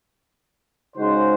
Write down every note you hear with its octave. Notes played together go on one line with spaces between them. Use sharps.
C#3 G#3 D#4 F#4 C5